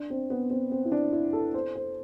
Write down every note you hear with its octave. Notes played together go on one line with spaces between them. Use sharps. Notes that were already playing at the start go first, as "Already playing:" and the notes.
Already playing: D4
C4
B3
C4
C4
E4
D4
E4
A4
C5
C5